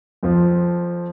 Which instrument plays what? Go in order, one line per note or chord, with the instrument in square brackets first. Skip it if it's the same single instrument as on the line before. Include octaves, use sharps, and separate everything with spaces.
[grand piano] F2 F3